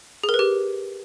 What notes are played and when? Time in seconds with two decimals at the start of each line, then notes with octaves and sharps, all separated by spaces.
0.24 G#4
0.29 A#4
0.34 B4
0.39 G4